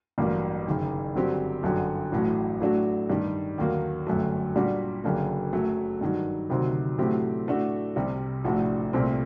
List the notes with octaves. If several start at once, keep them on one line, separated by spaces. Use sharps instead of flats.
A1 G2 F#3 A#3
F#1 F#2 D#3
G1 G2 F#3 C4 G4
G1 F#2 D3 F#3
A1 A2 F#3
A2 F#3 A3 D4 F#4
G2 D#3 G3
D#2 D3 F#3 A#3
G1 F#2 F#3 A3
A#2 G3 D4 F#4
F#1 F#2 D3 F#3 A#3
F#2 F#3 A3
G2 D#3 F#3
D2 C3 D#3 F#3 C4
A2 F#3 A3 C4 G4
A2 A3 D4 F#4
C2 C3 G3
A#1 A2 A3 D4 F#4
C2 A#2 A3 C4